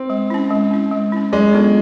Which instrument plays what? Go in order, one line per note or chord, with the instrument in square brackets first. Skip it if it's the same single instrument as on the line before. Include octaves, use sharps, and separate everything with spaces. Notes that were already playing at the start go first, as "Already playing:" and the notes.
Already playing: [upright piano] C4
[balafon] G#3
C#4 E4
G#3
C#4 E4
G#3
C#4 E4
[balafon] F#3 [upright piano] G#3
[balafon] B3 D4 F4 A4